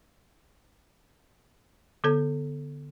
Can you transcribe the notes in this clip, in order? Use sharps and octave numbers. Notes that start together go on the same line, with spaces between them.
D3 B3 A4 G#6